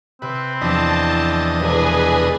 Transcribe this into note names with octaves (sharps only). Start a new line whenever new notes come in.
C3 C4 B4
E2 F3 D4 E4 D#5 A5 B6
E1 C3 G4 G#4 B4 G#5